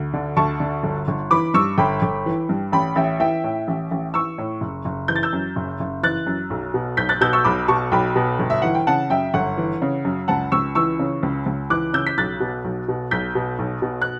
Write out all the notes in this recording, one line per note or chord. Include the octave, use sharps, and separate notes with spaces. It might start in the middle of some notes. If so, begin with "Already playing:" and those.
Already playing: D2
D3
D2 A5 C#6
D3
G1
G1
E3 B5 D6
G2 C#6 E6
G1 G5 B5
G1
E3
G2
A1 G5 B5
A1 E5 G5
E3 E5 G5
A2
A1
A1
E3 C#6 E6
A2
F#1
F#1
E3 G6
A6
E6 G6
F#2
F#1
F#1
E3 F#6 A6
F#2
B1
B2
B1 G6 B6
F#6 A6
B2 E6 G6
C#6 E6
B1 B5 D6
B2 A5 C#6
B1 G5 B5
B2
G1
E5
E3 F#5
G5
C#3 F#5 A5
F#2 E5 G5
G1 F#5
E3
C#3
F#2
C#2 F#5 A5
C#2 C#6 E6
E3 C#6 E6
C#3
C#2
C#2
E3 D6 F#6
C#3 E6 G6
B6
B1 F#6 A6
B2
B1
B2
B1 G6 B6
B2
B1
B2
F#6